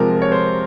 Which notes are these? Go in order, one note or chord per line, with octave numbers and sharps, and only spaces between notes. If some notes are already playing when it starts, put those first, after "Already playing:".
Already playing: C3 F3 G#3 A#4
C#5
C5